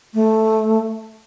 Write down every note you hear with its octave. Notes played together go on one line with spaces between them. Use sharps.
A3